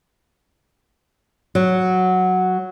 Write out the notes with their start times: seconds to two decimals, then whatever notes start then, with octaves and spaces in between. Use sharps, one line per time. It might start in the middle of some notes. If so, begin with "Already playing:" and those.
1.55 F#3